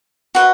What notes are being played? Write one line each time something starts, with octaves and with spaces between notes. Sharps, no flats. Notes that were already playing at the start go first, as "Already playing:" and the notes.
F#4 B4 D#5